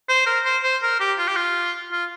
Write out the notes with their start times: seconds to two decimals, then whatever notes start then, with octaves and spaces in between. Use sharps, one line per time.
0.09 C5
0.26 A#4
0.45 C5
0.64 C5
0.82 A#4
1.00 G4
1.18 F4
1.28 G4
1.36 F4
1.92 F4